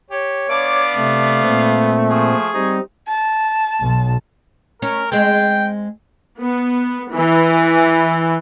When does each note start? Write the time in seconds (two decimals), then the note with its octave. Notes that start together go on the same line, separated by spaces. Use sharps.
0.11 G4 C#5
0.49 B3 D4 D5 F5 D6
0.95 C3 A3
1.43 A#2 C4
2.10 F3 G#4 C#6
2.54 G3 C4 D#4
3.07 A5
3.79 B1
4.82 C#4 A#4
5.12 G#3 C4 G5
6.39 B3
7.11 E3